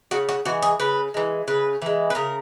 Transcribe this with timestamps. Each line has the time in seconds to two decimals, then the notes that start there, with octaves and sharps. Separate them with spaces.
0.11 C#3 F#4
0.29 F#4
0.45 E3 G#3 F#4
0.62 G#4
0.80 C#3 B4
1.14 E3 G#3
1.48 C#3 B4
1.82 E3 G#3
2.10 B4
2.15 C#3 A#4